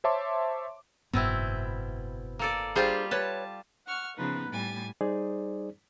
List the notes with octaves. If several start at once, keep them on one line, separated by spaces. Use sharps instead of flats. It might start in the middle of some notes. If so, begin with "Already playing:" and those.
C5 C#5 E5 A5 C6 D6
F#1 G#2 B2 B3 C4 E4
A#3 A4 D5
G3 D4 F4 G4 G#4 C5
B4 C#5 A5
F#5 C#6 F6
C#3 F3 B3 D#4 B4
A2 G3 G#5 A6
G3 D#4 G#4 C5 D5